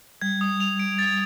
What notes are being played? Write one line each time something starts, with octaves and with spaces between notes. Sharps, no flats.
G3 G#6
D#6
F7
D7
A6